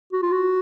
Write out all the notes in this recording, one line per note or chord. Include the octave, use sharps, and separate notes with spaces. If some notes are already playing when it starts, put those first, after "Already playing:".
F#4
F4
F#4